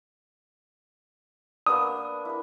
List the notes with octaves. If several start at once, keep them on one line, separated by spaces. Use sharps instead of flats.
A#3 B3 D4 D#6
E4 A#4